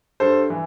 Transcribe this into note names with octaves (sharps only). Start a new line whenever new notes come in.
G2 A4 C5
E3